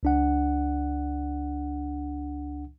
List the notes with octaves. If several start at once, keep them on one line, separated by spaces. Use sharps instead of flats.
C#2 D4 F#5